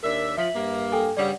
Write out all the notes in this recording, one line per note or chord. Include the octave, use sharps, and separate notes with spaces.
D#2 D4 A#4 E5
F3 E5 B6 F#7
G2 A#3
A4 G5 G#5
G2 C#3 G3 D5 F#5